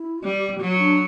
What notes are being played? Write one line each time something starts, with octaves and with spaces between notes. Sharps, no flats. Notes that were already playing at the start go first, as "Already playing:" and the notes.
Already playing: E4
G3 G4
F#3 F#4
D4